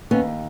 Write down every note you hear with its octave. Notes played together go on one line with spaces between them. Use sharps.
D#2 B3 C#4